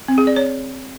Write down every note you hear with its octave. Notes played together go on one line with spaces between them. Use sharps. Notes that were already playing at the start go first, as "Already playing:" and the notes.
C4
G#4
D5
C#5